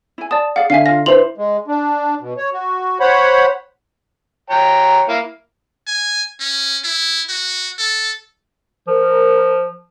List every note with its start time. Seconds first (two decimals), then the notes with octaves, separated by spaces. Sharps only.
0.18 E4 G#5
0.31 D5 A5 D#6
0.56 G#4 D5 F5 F#5
0.70 D3 E5 F5 G#5 C7
0.86 F4 F5 A#6
1.06 D4 E4 B4 C5 C6 F7 F#7
1.38 G#3
1.68 D4
2.21 B2
2.37 C#5
2.53 F#4
3.00 C5 C#5 F#5 B5
4.50 C#5 G5 A#5
5.09 A#3 E4 F5
5.87 G#5
6.40 C#4
6.84 E4
7.29 F#4
7.79 A4
8.87 F3 A#4